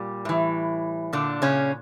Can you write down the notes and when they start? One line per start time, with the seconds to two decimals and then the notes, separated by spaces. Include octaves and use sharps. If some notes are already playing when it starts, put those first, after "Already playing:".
Already playing: A#2 G3
0.25 A2 E3
1.13 A#2 D3 D4
1.42 C#3 C#4